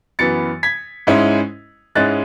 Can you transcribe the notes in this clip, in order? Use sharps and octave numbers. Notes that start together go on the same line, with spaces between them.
F#2 E3 B3 A6 C#7
G#6 B6
G#2 G#3 C#4 E4
G#2 G#3 C#4 E4 F#6 A6